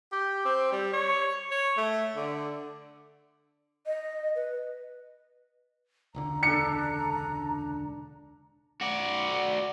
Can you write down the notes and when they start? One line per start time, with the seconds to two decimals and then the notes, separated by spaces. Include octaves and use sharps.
0.12 G4
0.45 C4
0.72 G3
0.93 C#5
1.52 C#5
1.78 A3
2.16 D3
3.86 D#5
4.36 B4
6.15 E1 C#2 D3 A#5
6.43 D4 A4 C#7
8.81 F#4 D5